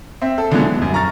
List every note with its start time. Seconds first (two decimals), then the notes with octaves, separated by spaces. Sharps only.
0.22 C4 E5
0.38 A4
0.51 B2 D3 F3 F#3 G#3 B3
0.64 E3
0.77 D#1 F#2
0.94 A#5 C#6 F6 A6